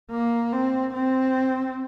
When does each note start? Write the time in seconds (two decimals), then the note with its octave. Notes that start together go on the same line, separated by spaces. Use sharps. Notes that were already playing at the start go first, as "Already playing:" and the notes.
0.11 A#3
0.53 C4
0.93 C4